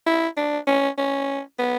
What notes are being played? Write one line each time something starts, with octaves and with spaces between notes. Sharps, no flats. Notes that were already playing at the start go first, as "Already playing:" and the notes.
E4
D4
C#4
C#4
B3